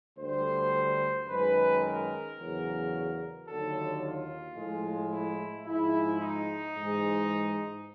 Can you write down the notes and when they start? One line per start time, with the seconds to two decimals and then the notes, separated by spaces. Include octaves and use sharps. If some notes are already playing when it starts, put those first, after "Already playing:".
0.17 D2 D3 G3 C5
1.27 F#2 D#3 G#3 B4
1.82 A#4
2.37 E2 C#3 F#3
3.46 D#2 D3 F#3 A4
4.01 F4
4.55 A2 F3 G#3
5.11 E4
5.65 G#2 F3 G#3 E4
6.20 D#4
6.75 G#2 E3 G#3